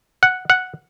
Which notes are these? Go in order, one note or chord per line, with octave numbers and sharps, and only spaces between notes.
F#5
F#5